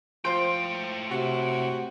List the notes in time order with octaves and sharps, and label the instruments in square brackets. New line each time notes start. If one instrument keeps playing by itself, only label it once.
[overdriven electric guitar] A2 G5 [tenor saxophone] F3 [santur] C5
[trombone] C3 [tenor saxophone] F#4